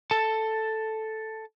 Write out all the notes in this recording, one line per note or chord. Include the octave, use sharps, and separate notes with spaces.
A4 A5